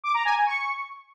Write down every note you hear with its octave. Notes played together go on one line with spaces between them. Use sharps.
D6
A#5
G#5
G#5
C#6